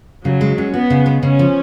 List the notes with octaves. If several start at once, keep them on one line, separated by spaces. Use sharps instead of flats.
C#3 F#3
G#3
C#4
B3 F#4
C#3
G#3
C#3 C#4
F3